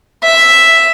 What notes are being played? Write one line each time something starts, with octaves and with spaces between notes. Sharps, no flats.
E5